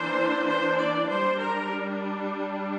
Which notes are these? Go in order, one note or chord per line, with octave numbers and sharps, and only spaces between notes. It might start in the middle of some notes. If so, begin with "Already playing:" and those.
Already playing: E3 A#3 D4 C5
C5
D5
G3 D4 C5
A#4